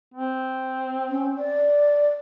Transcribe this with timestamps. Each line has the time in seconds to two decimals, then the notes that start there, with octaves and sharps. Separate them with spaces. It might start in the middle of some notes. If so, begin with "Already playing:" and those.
0.14 C4
1.09 C#4
1.37 D5